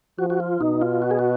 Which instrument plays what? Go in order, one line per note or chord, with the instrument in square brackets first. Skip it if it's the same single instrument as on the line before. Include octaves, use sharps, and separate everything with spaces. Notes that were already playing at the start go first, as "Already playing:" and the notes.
[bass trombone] F3 [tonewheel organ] F#4
[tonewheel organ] F#4
F4
[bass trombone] B2 [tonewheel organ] D#4
[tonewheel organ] F4
F#4
G#4
F#4